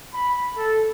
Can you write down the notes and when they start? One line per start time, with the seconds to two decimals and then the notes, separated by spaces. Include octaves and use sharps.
0.12 B5
0.56 A4